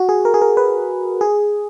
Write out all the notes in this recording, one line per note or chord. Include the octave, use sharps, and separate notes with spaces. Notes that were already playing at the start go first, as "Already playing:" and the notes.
Already playing: F#4
G#4
A#4
G#4
A#4
B4
G#4